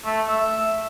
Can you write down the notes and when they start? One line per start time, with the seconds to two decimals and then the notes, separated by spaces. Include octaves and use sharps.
0.05 A3
0.28 E5